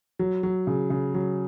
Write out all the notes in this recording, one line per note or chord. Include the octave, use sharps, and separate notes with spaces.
F#3
F#3
C#3
C#3
F#3